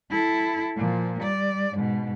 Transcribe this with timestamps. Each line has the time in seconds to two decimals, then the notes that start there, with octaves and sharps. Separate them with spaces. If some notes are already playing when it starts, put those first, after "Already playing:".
0.11 E4 A4
0.77 A#2 F3
1.21 G3 D5
1.73 G#2 B2